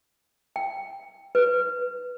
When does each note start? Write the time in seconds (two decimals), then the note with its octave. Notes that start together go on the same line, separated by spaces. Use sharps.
0.56 G5
1.35 B4